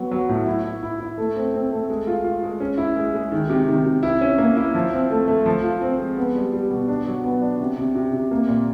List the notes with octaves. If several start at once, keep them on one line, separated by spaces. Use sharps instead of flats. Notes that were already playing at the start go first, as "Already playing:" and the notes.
Already playing: F#3 B3
F#3
A2
E4
E4
E4
E4
A3
C4
C4
A3
G#3
F4
F4
G#3
C#4
E4
G#3
G#3
D#3
C3
D#3
C3
E4
C#4
A#3
E4
F3
C4
A3
A3
F3
F4
C4
G#3
B3
G3
G3
B2
D4
F#3
B3
D4
C3
C3
C3
C3
A#3
A#2